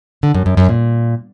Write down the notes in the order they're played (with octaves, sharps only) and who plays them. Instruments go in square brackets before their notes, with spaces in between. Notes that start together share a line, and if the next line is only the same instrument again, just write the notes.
[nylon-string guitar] D3
F#2
F#2
F#2
A#2